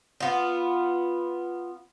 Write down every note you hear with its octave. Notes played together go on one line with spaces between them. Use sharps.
B3 F4